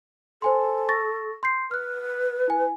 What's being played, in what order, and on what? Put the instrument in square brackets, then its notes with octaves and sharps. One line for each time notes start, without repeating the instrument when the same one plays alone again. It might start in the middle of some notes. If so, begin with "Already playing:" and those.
[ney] A4 [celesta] C5 G#5 C6
[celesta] C#6 A6 A#6
C6 G6 C7
[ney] B4 [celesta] F6 F#6
[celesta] E4 G#5